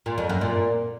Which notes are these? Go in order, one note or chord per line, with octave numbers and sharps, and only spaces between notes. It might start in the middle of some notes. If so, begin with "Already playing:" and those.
A#2
F2
F#2
A#2